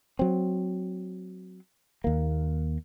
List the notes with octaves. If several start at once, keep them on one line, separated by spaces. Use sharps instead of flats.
F#3 C4
D#2 A#3